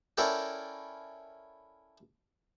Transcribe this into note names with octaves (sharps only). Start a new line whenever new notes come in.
C#4 E4 A4 A#4 D5 G5